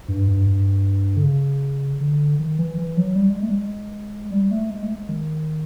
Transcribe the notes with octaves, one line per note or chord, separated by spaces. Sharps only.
G2
G2
G2
D3
C#3
D3
D#3
E3
E3
F#3
G3
G#3
A3
G3
G#3
G3
A3
G#3
A3
G#3
D#3